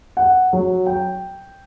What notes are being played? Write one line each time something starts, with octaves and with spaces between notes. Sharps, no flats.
F#5
F#3
G5